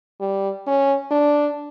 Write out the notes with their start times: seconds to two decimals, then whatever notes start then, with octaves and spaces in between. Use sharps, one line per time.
0.20 G3
0.67 C#4
1.11 D4